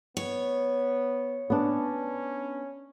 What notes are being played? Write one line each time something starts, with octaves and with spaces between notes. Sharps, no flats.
B3 C#5
B3 C#4 D4